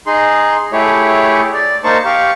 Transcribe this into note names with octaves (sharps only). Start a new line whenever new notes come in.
D#4 G#4 C6
A3 E4 G4 G#4 C#5
D5
A#3 D#4 C5 A5 C#6
G4 F5 C#6